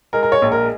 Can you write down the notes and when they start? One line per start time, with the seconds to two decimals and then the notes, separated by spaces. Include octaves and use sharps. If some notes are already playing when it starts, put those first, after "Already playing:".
0.13 G#3 A#4
0.23 A#4
0.32 C#5
0.42 A#1
0.52 A#4